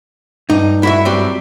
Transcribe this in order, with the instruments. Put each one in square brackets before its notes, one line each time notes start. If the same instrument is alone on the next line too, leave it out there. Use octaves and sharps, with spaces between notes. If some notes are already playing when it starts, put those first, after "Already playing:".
[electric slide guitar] G2 [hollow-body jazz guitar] D#4
[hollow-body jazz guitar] E4 F#4 E5
F#3 G3 C4